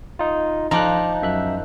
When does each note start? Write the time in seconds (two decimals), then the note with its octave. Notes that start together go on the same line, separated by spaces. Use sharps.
0.19 D#4 F4
0.71 F3 D#4 A#5 D6 F#6
1.22 F#2 E5 F#6